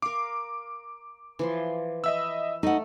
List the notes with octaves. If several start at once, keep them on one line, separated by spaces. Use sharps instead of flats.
A#4 F5 D6
E3 F3 C6
D#5 E5 B5 E6
A3 D#4 F#5